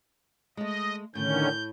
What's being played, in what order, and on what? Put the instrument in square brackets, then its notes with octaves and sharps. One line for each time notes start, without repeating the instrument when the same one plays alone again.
[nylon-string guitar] G#3 A3 [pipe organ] D#5
[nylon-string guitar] A2 [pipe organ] D3 D#3 C#4 [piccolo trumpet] G6